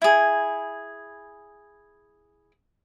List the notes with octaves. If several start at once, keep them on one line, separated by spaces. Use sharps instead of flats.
E4 G#4